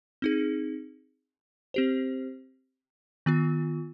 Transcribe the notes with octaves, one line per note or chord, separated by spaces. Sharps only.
C4 D#4 G#4
C4 G4 C5
D#3 B3 F4